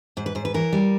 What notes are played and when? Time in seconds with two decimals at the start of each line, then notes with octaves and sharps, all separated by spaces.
0.17 G#2 C5
0.26 B4
0.35 G#2 C5
0.45 B4
0.54 E3 A#4
0.73 G3